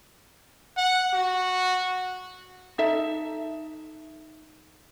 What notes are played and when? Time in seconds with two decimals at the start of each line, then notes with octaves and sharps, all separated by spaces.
0.77 F#5
1.14 F#4
2.78 D#4 A4 E5